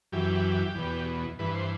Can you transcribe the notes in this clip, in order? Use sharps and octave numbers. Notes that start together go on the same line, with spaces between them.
F#2 E3 G4
E2 B2
G2 E3 B4
C5